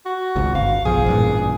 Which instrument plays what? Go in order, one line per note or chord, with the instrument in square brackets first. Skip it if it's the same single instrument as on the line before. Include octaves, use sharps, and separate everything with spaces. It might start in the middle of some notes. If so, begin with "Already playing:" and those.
[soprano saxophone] F#4
[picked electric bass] G#1 C#2 G#2
[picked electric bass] G1 [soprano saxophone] F5
[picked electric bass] B1 F3 [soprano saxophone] G#4
[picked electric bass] A1 G2 A#2